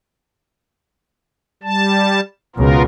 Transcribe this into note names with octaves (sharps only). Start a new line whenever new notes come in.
G3 A5
C#2 B2 B3 F4 A#4